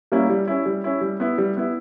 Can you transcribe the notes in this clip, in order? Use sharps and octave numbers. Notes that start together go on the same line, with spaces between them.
G3 A#3 C#4 E4
G3
C#4 E4
G3
C#4 E4
G3
B3 E4
G3
B3 E4